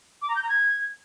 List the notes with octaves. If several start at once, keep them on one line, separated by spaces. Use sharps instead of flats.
D6
A#5
G6
A#5
G#6